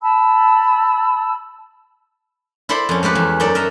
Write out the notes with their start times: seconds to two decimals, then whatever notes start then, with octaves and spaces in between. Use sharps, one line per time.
0.01 A5 B5 E6
2.69 E4 A4 C5 D5 B5 C6
2.89 F2 C#4
3.03 G#3 A3 G4 B4
3.15 E2
3.40 F#2 D#4 A4 D5
3.55 A#4 D#5 E5